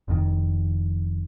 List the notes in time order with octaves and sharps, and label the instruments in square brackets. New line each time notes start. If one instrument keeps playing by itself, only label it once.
[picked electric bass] F1 F2 G#2 D#3